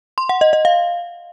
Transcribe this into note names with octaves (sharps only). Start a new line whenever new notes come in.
C6
F#5
D#5
D#5
F5